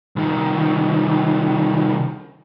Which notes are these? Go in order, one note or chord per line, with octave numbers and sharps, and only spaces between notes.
C2 D#3